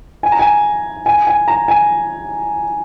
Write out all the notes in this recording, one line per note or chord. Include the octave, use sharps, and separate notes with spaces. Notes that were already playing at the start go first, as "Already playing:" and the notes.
G#5
A#5
G#5
G#5
G#5
A#5
G#5